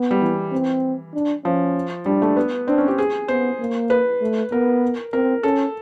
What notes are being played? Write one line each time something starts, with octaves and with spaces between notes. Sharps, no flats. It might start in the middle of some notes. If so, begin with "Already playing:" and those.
Already playing: B3
G3
E3
C4
D4
F3 C#4
G3 D4
A3
B3
C4 D4
C#4
G4
G#4
B3 C5
A#3
B4
A3
B3 A#4
C4 A#4
C#4 A4